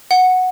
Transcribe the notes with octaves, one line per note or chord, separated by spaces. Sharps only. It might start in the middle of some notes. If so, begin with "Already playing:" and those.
F#5